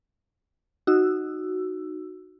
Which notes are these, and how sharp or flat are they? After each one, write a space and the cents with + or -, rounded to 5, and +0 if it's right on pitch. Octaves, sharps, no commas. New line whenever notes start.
D#4 -10 F#4 +0 E6 +10